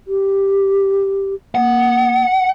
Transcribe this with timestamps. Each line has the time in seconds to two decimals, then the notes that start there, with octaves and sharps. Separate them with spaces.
0.08 G4
1.55 A#3 F#5